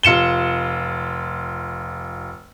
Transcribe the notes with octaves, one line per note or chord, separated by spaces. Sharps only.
F1 F4 C#7 E7 G7